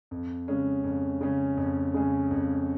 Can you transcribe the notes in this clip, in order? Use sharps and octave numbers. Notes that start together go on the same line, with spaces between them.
F2
C#3 G#3 C#4
F2
C#3 G#3 C#4
F2
C#3 G#3 C#4
F2